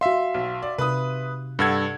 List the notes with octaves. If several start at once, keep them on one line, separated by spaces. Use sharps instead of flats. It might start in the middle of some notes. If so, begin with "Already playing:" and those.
F#4 E5 F5 C6
B1
D5
C3 D#4 B4 D#6
G2 A4 F#5 E6 G#6